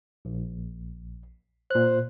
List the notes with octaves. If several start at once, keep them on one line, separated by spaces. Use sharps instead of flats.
A#1
A#2 C5 F#6